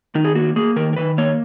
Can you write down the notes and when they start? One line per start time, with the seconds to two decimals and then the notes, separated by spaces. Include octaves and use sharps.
0.15 D#3 D#4
0.25 G#4
0.35 A#3 F#4
0.56 A#3 G#4
0.76 D#3 A#4
0.93 A#4
0.96 D#3 B4
1.18 A#3 C#5